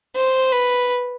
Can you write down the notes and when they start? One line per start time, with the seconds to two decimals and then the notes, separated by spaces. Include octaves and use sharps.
0.16 C5
0.53 B4